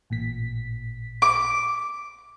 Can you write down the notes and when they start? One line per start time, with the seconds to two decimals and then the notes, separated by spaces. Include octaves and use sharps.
0.10 A1 A#2 B6
1.22 D6